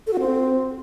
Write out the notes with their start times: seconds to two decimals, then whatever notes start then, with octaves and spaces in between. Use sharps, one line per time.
0.07 A4
0.13 F#4
0.19 C4